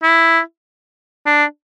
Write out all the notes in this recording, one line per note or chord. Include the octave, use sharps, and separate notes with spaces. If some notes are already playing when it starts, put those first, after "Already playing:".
E4
D4